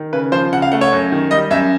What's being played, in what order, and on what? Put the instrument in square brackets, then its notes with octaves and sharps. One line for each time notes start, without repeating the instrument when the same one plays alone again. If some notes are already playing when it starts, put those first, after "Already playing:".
Already playing: [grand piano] D#3
C#3 B4
F3 C5
C#3 F#5
F5
A3 F#5
C#5
F#2
D#3
G3 D#5
F#2 E5